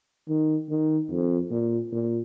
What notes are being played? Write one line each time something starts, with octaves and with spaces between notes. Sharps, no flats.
D#3
D#3
F2
A#2
A#2